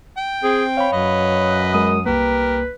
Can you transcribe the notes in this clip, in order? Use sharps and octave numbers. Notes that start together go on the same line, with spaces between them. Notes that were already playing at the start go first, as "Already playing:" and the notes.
G5
C4 G#4
C#5 F5 B5
F#2 B4 D#5
G#3 A#4 D#6
C2 A#3 G4 A#4 B4